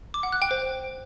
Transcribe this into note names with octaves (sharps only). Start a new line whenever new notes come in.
D6
F#5
F#6
G5
C5